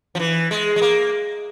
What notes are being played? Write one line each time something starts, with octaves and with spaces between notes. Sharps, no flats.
F3
E3
G#3
G#3
A#3